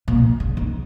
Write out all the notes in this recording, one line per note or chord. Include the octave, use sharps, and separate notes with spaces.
A#2
C#3
D#3